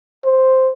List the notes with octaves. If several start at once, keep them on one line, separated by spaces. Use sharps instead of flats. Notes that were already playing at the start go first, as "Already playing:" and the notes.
C5